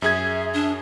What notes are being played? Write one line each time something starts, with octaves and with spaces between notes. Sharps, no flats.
F#2 G#4 E5 G#6
D4